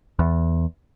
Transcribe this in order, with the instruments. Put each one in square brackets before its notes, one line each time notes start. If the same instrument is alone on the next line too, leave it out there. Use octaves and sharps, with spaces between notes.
[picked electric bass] E2